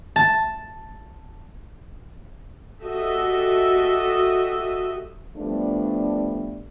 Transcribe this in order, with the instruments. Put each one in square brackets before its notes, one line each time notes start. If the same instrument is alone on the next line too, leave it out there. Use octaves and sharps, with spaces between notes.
[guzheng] A5
[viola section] F#4 G4 A4 D#5 E5
[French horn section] F3 G3 A3 B3 D4